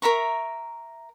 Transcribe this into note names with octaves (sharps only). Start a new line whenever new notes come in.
A#4 E5 A#5 C#6